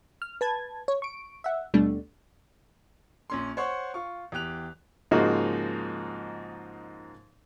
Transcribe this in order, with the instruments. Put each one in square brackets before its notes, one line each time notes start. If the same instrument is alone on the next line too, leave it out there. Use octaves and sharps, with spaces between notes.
[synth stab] F6
B4 A5 G#6
C#5
C#6 D7
E5 F#5
D#2 B2 G3 A3 D4
[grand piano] A#1 C#4 C6
C5 C#5 F#5 C6 C#6
F4 C#6
E2 G4 G5 F#6 F7
[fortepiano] G#2 C#3 F3 A#3 D#4 F#4